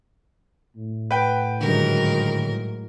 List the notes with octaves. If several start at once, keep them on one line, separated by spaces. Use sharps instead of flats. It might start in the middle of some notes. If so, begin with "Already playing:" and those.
A2
B4 F#5 G5
G#2 D3 D#3 F#3 G3 A#4